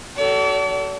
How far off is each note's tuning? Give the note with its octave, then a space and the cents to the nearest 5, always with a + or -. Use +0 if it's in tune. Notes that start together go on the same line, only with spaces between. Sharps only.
F#4 +40 A4 +5 D5 -45